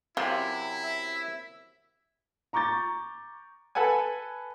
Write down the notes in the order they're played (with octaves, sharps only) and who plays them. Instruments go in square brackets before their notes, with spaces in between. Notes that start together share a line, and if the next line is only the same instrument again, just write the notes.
[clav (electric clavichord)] F#2 C3 [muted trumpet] E4 [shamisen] F4
[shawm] E5
[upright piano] A#5 C#6 D6 G6 A6
[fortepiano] A4 B4 F#5 G#5